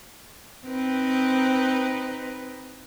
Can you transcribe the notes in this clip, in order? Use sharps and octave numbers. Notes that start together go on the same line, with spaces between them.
C4 D#4 B4